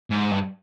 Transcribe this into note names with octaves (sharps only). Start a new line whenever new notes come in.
G#2
G2